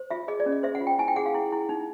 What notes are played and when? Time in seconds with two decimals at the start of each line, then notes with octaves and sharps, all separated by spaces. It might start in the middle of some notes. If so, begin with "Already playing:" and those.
Already playing: C5
0.11 F4 E5
0.28 G#4 D#5
0.40 D5
0.46 C#4
0.52 D#5
0.63 C5 E5
0.75 F#5
0.81 F4
0.87 G5
0.99 E4 G#5
1.08 G5
1.16 G#4 F#5
1.26 F5
1.34 E4
1.52 E4
1.69 D#4